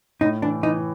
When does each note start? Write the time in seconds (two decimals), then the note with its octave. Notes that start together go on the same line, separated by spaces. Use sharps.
0.21 A2 D#4
0.42 E3 D4
0.63 E3 D#4